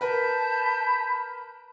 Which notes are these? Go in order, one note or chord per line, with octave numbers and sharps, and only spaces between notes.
A#4 B4 A5 B5 G6